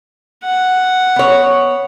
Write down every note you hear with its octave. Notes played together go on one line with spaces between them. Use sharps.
F#5
B3 C#5